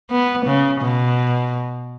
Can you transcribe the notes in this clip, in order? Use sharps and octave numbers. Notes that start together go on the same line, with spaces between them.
B3
C#3
B2